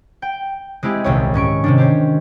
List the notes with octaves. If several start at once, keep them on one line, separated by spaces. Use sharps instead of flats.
G5
G#3 C4 E4 G4 G#4
D#1 C2 G4 C#5
G#2 C#4 C#6 D7
C3 D#3 D4
G4 C5 C#5